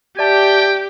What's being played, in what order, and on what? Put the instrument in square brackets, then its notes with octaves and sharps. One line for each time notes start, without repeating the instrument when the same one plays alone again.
[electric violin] G4 [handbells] D5 E5 A5 [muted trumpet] G5